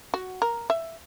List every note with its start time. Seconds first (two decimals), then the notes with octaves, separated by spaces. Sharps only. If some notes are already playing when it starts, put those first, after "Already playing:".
0.14 F#4
0.42 A#4
0.70 E5